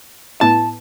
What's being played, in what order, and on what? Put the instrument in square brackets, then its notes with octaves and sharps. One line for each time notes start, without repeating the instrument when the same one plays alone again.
[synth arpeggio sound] A2 B3 E4 [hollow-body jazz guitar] A5